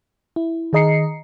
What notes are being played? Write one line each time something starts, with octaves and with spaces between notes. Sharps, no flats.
E4
D#3 G#4 D#5 A#5 C7 C#7